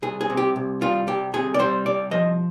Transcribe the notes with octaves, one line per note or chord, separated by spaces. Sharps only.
C2 G#4
G#4
C3
G4
C2
G3 F4
C2 G4
C3 G#4
D5
G3 C5
C2 D5
F3 D#5